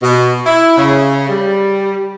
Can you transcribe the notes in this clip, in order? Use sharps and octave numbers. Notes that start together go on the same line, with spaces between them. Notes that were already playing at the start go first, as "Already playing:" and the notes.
B2
E4
C#3
G3